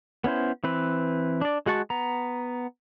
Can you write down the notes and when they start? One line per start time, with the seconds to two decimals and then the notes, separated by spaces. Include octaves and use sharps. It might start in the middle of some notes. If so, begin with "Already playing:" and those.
0.24 B3 C#4 E4 C5
0.64 E3 C4 B4
1.41 D4 D5
1.66 G#3 F#4 F#5 A5 C#6
1.90 B3 A#5